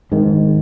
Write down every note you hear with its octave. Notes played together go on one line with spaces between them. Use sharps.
G#1 G#2 D#3